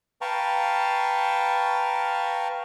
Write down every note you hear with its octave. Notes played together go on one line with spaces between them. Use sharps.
B4 F5 G5 A5 A#5 C#6